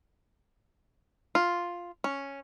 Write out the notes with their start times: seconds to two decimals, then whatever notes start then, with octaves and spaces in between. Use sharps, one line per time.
1.35 F4
2.04 C#4